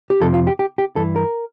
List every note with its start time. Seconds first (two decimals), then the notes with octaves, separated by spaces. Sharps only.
0.10 G4
0.21 F2 C3 F3 A4
0.34 F4
0.47 G4
0.59 G4
0.78 G4
0.96 G2 E3 A4
1.16 A#4